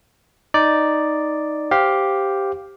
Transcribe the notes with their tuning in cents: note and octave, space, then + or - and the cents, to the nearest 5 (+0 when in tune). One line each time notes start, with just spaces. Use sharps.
D#4 +0 D5 +0
G4 +0 C5 +0 F5 +10